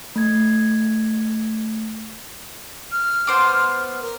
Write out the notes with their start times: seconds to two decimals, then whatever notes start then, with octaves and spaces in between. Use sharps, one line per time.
0.16 A3 G#6
2.92 F6
3.27 B3 C5 D6
4.01 A#4